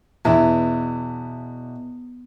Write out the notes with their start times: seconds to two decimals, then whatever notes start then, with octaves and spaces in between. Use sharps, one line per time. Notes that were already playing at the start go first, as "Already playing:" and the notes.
0.25 E2 B2 E4